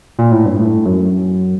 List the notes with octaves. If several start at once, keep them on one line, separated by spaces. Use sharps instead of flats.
A#2
A2
G2
A2
F#2